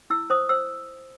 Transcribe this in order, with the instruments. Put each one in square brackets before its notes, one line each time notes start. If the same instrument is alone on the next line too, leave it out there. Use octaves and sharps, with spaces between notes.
[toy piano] E4 E6
C5 D#6
C5 E6